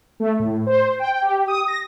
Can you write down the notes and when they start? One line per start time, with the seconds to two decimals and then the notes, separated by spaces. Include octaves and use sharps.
0.20 A3
0.40 A2
0.67 C5
0.99 G5
1.22 G4
1.48 D#6
1.68 A#6